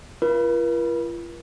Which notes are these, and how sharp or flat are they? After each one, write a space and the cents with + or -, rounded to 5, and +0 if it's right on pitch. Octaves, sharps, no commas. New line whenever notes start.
F4 -40 A#4 +45